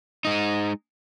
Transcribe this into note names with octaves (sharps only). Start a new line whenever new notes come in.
G#3 D#4